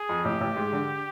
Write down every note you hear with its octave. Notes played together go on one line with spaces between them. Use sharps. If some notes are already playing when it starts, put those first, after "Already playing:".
Already playing: G#4
F2
A1 G4
A1
G#2
D3